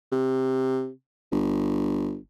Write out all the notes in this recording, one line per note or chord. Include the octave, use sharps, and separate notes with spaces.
C3
G1